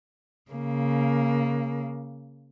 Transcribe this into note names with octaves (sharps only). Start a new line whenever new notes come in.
C#3 A#3